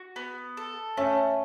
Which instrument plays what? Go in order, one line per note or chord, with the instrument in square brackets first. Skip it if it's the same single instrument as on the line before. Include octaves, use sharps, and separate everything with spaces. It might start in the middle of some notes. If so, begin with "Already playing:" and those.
Already playing: [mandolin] F#4
B3
A4
[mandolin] A3 [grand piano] C#4